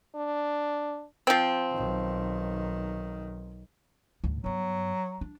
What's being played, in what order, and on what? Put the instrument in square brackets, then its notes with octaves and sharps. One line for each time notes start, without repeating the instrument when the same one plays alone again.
[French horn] D4
[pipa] F3 C4
[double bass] B1 D#3
[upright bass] D2 G#2
[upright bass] G2 B3 [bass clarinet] F#3
[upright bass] D4